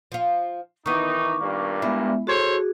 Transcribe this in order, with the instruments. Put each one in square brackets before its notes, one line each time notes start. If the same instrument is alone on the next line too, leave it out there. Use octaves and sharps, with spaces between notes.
[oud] F3 F4
[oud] D#3 B3 [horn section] E3 D#4 [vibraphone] C#6 D6
[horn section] G2 A#2 A#3
[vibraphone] G#3 B3 E5 [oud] E4
[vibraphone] F#4 G#4 [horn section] A4 C5 C#5